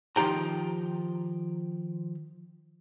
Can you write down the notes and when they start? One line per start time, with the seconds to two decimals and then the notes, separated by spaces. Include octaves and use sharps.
0.16 D#3 F3 G4 G5 A#5